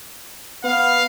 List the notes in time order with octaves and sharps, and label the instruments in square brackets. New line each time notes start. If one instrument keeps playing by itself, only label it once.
[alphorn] B3 [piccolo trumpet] F5